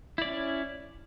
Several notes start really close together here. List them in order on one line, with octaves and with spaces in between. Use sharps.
E4 D5 C#4